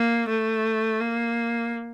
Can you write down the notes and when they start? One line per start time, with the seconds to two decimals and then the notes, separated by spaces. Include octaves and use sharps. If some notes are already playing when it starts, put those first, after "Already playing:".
Already playing: A#3
0.28 A3
1.00 A#3